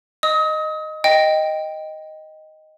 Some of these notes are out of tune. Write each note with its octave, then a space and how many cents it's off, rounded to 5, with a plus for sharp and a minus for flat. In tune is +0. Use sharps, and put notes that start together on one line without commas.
D#5 -10 D#6 +35
D#5 +0 G5 +0